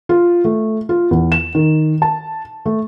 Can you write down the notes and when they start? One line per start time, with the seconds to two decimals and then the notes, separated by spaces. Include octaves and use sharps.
0.09 F4
0.44 A3
0.89 F4
1.11 E2
1.32 E7
1.55 D#3
2.02 A5
2.66 A3